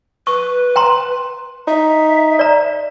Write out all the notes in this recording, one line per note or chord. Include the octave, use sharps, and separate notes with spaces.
B4 C#6
G5 A#5 C6
D#4 E5
D5 A#5